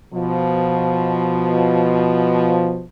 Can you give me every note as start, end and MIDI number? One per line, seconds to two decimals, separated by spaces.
0.14 2.83 47
0.14 2.83 53